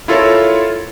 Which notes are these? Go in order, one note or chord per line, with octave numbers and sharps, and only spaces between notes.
E4 F4 A4 A#4 C#5